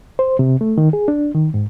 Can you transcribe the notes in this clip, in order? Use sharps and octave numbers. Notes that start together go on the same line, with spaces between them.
C5
C3
A3
D#3
G#4
D4
D#3
G#2